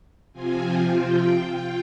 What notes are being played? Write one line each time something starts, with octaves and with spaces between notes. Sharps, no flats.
C3 F3 C4 F4 G#5
G5
F4